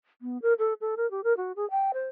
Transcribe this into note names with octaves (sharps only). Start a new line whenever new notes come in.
B3
A#4
A4
A4
A#4
G4
A#4
F#4
G#4
G5
C5